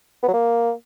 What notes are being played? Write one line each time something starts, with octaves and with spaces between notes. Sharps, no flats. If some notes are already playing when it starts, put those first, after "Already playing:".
B3
F#3
A#3